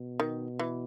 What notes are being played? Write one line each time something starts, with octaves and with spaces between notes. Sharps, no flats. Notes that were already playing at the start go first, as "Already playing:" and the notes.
Already playing: B2
D#3
E3